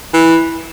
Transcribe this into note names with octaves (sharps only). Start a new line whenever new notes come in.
E3